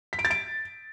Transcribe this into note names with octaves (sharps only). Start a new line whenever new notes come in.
B6
D7
A6
D7